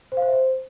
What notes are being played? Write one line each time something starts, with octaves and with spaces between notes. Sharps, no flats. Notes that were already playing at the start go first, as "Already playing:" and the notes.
C5
F5
C5
E5
C5